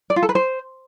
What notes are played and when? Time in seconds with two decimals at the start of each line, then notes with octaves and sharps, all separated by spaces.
0.10 D5
0.16 F4
0.23 A4
0.29 B4
0.35 C5